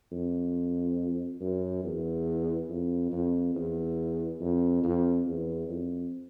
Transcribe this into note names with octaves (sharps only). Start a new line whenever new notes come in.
F2
F#2
E2
F2
F2
E2
F2
F2
E2
F2